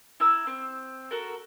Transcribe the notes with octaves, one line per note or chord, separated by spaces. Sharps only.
E4 A#5 E6
C4
F#4 A4 A#4